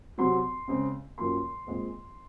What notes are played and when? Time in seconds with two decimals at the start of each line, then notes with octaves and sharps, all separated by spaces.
0.18 C3 F#3 C4 C6
0.68 C#3 G#3 C4
1.18 F#2 F3 A#3 C6
1.67 A#2 G#3 C4